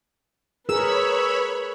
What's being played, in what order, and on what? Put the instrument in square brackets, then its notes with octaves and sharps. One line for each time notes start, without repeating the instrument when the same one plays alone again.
[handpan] G#4 A#4 [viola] B4 [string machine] C#5 B5 [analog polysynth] E6